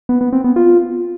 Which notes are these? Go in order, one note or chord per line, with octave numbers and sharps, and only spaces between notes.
B3
B3
C4
B3
F4